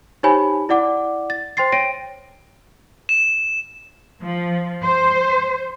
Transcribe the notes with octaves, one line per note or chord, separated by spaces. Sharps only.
D#4 G4 C5 C#5 G#5 B5
E4 D5 F#5 D6
A6
C5 G5 C6 A6 C7
C#5 G5 A#6 D7 D#7
E7
F3
C5